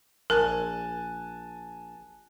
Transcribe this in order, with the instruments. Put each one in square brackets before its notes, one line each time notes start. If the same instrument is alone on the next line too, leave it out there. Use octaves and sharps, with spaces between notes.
[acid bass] A#1 [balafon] A#4 [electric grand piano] G#5 A5 F#6